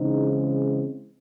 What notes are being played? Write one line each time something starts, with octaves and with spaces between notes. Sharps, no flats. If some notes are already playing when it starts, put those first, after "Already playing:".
Already playing: C#3 E3 G#3 C4 D#4